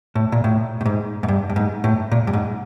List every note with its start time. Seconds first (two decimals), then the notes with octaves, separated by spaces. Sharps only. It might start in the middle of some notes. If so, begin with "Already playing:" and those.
0.15 A2
0.32 A#2
0.44 A2
0.81 A2
0.86 G#2
1.23 G#2
1.28 G2
1.50 G2
1.56 G#2
1.84 A2
2.11 A#2
2.27 G2
2.33 G#2